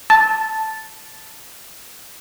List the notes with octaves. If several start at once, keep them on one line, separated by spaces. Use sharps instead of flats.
A5 A6